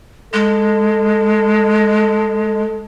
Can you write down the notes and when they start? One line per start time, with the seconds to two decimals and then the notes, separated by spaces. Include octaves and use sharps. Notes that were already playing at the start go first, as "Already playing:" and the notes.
0.34 G#3 A4